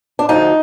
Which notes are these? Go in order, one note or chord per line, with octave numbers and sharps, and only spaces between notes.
D4
D2 D3 F3 D#4